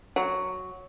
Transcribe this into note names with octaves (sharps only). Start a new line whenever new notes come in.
F#3